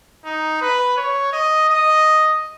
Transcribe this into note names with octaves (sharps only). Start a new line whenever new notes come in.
D#4
B4
C#5
D#5
D#5